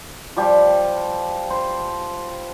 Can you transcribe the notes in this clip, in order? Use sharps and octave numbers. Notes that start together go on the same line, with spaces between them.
F3 G3 G4
C5